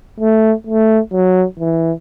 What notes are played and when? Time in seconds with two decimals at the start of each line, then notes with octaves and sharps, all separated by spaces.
0.20 A3
0.67 A3
1.13 F#3
1.59 E3